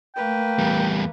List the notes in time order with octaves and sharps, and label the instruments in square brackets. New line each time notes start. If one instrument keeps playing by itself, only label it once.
[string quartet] A3 A#3 B4 [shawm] G5
[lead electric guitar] E2 G3